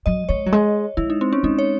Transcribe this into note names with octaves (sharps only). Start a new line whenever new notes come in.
F#3 D#5
G#3 C#5
F#3
G#3
G#3 E4
D#4
C4
C#4
G#3 D#4
C#5